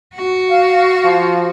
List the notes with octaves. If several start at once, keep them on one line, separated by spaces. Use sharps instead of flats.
F#4
F5
F3